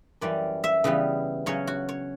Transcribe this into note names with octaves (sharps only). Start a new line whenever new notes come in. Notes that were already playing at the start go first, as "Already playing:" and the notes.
F#2 E3 G3 C#4 D5
E5
C#3 E3 G3 B3
C#3 F#3 C#4 C#5
F#4
C#5